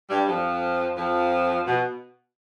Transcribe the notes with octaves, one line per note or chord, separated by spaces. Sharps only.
G2 G3
F2 F3
F2 F3
B2